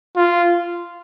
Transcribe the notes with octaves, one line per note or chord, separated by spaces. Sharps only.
F4